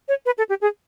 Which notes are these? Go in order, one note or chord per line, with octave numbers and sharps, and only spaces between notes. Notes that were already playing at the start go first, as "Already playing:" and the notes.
C#5
B4
A4
G4
G#4